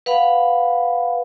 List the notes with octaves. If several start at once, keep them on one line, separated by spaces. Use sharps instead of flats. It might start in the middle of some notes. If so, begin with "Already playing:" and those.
B4 F5 F#5 B5